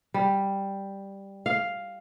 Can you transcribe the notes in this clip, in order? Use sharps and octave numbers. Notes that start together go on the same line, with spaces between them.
G3
F5